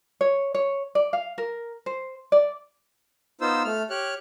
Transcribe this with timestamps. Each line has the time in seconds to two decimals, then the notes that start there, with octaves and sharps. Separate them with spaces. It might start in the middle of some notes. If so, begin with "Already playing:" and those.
0.21 C#5
0.55 C#5
0.95 D5
1.13 F5
1.38 A#4
1.86 C5
2.32 D5
3.41 B3 D#4 F4 C5 E6
3.64 A3 F6
3.90 G4 C#5 F6 F#6